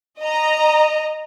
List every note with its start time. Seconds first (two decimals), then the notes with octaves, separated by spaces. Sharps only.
0.21 D#5 A#5